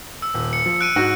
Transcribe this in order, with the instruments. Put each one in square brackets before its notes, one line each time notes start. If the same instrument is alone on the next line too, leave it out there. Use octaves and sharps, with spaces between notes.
[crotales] E6
[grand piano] D#1
[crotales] C#7
[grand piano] F3
[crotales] F#6 D7 D#7
[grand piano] G#2 F#4